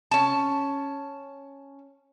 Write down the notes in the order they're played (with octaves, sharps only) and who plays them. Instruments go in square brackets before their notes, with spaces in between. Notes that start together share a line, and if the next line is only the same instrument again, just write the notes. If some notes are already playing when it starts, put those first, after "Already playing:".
[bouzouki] C#4 A5